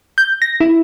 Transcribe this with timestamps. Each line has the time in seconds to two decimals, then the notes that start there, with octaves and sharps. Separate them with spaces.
0.18 G6
0.42 A#6
0.60 E4